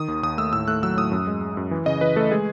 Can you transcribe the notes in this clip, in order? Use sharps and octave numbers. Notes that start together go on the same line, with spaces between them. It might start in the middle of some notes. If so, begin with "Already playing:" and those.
Already playing: D#3 D#6
D#2
D#2 D#6
A3 E6
A2 E6
A3 F#6
F#3 E6
A2 D#6
F#2
G#3
G#3
F#2
E3
C#3 D#5
E3 B4
A3 A4
G#3 G#4